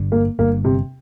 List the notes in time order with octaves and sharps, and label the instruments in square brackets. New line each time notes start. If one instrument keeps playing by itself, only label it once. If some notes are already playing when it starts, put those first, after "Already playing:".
Already playing: [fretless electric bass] G1 G2 D3
[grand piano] A#3
[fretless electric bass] G1 G2 D3 [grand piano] A#3
[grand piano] C3